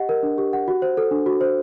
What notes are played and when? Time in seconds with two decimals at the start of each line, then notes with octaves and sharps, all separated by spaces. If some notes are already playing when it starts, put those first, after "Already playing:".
Already playing: G4 D#5 F#5
0.09 A#4
0.23 D4
0.38 G4
0.53 F#5
0.68 F#4
0.82 C5
0.97 A4
1.11 D4
1.26 F#4
1.41 C5